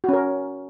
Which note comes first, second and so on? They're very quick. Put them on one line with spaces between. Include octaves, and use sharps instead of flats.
F#4 C#4 A#4